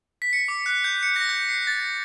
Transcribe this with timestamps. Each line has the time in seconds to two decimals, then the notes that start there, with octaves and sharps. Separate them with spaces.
0.22 B6
0.33 C#7
0.48 D6
0.66 F#6
0.84 G6
1.03 C#7
1.16 A#6
1.29 G6
1.49 C7
1.67 A6